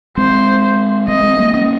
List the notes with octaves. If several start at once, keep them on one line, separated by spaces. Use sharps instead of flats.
G#3 C4 C5
G#3 C4 D#5
G#3 C4
G3 A#3
A#3 C#4